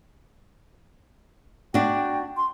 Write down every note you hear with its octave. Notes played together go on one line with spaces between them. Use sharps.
D4 F#4 G5
C6